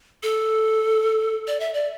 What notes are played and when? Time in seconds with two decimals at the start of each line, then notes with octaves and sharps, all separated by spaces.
0.23 A4
1.47 D5
1.60 E5
1.74 D5